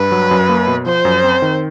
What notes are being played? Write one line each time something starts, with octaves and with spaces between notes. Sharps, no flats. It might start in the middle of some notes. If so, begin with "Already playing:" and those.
Already playing: G2 B4
F#3
F#2
A#3
B2
F3 C5
F#2
C4
D#3